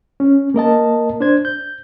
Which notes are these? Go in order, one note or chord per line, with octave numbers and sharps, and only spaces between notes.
C#4
A#3 A#4 D#5 A5
D4 C5 G#6
G6